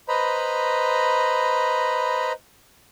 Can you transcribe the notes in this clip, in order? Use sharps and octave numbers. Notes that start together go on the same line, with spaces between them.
B4 C5 D#5 A#5 B5